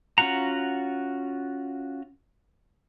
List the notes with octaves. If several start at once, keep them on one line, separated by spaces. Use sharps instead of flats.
C#4 F4 F#4 F#5 A#5